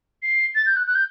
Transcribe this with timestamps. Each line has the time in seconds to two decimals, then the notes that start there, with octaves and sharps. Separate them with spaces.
0.23 C7
0.55 A6
0.66 G6
0.76 F#6
0.87 F#6
0.95 G6